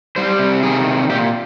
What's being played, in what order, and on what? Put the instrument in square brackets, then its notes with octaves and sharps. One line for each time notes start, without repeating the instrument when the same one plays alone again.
[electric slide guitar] G3 C5
C3
D#3 G#4
C3
A#2 G4